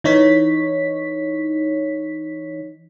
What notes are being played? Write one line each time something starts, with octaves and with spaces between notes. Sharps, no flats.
E3 D#4 C#5 B6